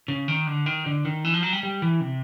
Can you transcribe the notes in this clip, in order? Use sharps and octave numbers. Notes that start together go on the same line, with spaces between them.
C#3
D#3
D3
D#3
D3
D#3
E3
F3
F#3
G3
G3
E3
C3